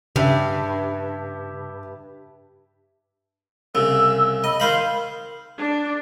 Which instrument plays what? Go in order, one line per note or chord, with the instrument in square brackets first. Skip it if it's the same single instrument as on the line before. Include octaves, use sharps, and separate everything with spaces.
[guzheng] G2 [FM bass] C#3 [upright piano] G4 E5
[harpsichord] C2 C#3 [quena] E6
[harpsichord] D#5 [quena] B5
[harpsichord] D#3 C5 B5 [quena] F5
[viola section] D4